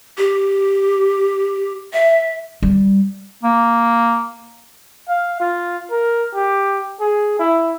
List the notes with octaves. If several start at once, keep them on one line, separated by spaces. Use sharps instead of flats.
G4
E5
G3
A#3
F5
F4
A#4
G4
G#4
E4